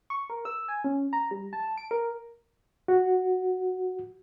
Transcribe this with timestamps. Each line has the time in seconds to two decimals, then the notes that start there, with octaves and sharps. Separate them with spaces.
0.10 C#6
0.30 A#4
0.45 E6
0.68 G#5
0.84 C#4
1.13 A#5
1.31 G3
1.53 A5
1.78 D7
1.91 A#4
2.88 F#4